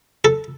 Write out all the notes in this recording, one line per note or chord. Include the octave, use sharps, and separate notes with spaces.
A4